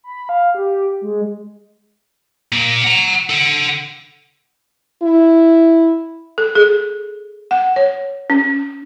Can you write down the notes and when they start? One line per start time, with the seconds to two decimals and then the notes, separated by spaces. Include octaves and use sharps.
0.04 B5
0.29 F5
0.55 G4
1.01 G#3
2.52 A#2 A#3
2.84 F#5 A#5
3.30 A4 F#5
5.03 E4
6.38 A4
6.55 G#4
7.51 F#5
7.76 C#5
8.30 C#4